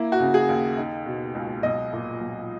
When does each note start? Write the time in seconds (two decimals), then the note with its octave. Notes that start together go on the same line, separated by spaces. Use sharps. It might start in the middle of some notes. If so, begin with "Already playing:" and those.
Already playing: A#3 E4
0.12 F#4
0.20 C#3
0.34 G#4
0.49 D#2
0.77 D#4
1.06 B2
1.35 C#2
1.63 B1 D#5
1.93 A#2
2.21 B1